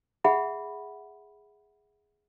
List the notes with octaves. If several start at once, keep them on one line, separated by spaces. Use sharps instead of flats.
G#4 E5 F#5 B5